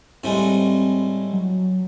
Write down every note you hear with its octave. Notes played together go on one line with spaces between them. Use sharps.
A2 G3 G#3 C4
F#3